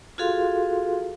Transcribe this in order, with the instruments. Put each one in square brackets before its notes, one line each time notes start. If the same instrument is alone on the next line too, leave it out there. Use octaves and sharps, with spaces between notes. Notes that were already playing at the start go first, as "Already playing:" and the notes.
[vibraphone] F4 F#4 G#4 A4 F5 C6